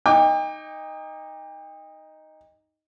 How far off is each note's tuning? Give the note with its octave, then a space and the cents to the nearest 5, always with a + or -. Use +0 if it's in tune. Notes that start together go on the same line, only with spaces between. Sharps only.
D#4 +0 G5 +40 D6 +0